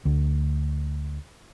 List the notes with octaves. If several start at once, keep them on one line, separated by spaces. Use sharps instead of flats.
D2